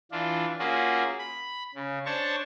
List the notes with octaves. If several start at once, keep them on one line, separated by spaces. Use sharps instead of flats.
E3 D4 F4
A#3 C#4 F4 F#4 G#4
B5
C#3
D4 C5 C#5 A5 C#6